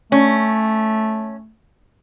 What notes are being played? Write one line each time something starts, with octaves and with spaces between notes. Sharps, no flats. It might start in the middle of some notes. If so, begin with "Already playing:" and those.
A3 C#4